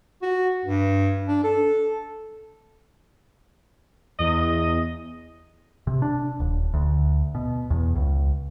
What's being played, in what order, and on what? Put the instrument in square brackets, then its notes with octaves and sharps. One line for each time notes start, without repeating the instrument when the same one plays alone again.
[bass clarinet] F#4
G2
D4
A4
[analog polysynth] E2 [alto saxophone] D#5
[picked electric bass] C3
D4
D#1
D2
B2
E2
C#2